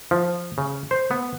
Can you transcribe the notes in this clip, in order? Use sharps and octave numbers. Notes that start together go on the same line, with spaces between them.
F3
C#3
C5
B3